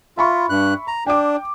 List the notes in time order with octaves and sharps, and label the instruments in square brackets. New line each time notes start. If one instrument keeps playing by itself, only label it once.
[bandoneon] F4 [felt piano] E5 B5 C#6
[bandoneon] G2 F#6
A#5
[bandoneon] D4 [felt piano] G5 D6